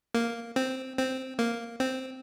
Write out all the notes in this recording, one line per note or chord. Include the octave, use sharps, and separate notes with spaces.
A#3
C4
C4
A#3
C4